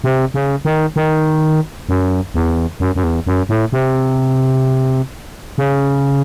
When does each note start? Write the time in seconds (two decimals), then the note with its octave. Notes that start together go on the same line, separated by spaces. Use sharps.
0.04 C3
0.34 C#3
0.65 D#3
0.96 D#3
1.89 F#2
2.34 E2
2.80 F#2
2.95 F#2
3.04 E2
3.26 F#2
3.49 A2
3.72 C3
5.58 C#3